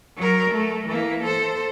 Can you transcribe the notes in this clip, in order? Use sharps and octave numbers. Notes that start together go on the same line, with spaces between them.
F#3 A#4
A3
E3 A#3
A4 C5